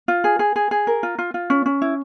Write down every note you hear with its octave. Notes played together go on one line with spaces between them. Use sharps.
F4
G#4
G#4
G#4
G#4
A#4
F4
F4
F4
C#4
C#4
E4